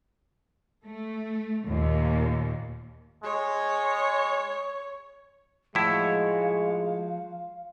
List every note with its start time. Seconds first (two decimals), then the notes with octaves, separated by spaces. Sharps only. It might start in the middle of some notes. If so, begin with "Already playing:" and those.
0.85 A3
1.65 D#2 A#2
3.24 G#3 C#5
5.75 A2 F3 G#3 E4 F#4 C#5 F5